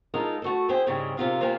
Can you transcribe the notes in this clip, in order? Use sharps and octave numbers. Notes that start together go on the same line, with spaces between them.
G#3 D#4 F4 A4 A#4
A3 F#4 A4
E4 G#4 C5 G5
G#2 C#3 G3 G#3 C4
G#2 C3 E3 F4 A#4 F5
C3 A#3 F4 B4 C5 G#5